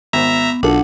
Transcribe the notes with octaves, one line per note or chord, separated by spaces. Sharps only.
G#1 B3 E5 A#5
B1 D4 F4 F#4 A4 F#5